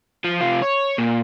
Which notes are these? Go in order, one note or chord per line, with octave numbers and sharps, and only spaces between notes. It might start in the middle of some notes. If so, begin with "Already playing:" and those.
F3
C3 F4
C#5
A#2